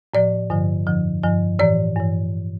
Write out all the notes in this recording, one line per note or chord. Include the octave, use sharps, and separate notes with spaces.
A2 F3 D5
G2 D3 F3
F2 D3 F3
G2 F3
A2 E3 D5
G2 E3